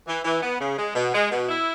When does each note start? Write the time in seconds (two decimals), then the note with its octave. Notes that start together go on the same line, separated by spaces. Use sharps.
0.07 E3
0.25 E3
0.43 B3
0.61 C#3
0.78 G#3
0.95 B2
1.14 G#3
1.31 B2
1.49 E4